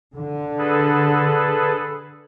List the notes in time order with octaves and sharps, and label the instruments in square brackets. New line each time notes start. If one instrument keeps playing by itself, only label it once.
[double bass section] D3
[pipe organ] G#4 A4 B4